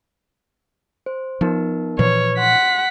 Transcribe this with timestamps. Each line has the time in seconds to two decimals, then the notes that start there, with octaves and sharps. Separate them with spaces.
1.06 C5
1.41 F3 B3 D#4 A#4
1.99 A#2 E3 F3 B4 C#5
2.39 F#5 C6 B6